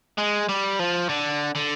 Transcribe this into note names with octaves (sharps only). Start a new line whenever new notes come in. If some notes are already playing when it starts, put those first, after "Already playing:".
G#3
G3
F3
D3
D3